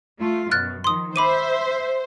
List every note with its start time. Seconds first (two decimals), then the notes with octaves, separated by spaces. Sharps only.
0.20 A3 F4
0.51 F#2 B2 F6 F#6 A6
0.84 D#3 F3 C6 D#6
1.16 C5 E5 B5 D6 D#7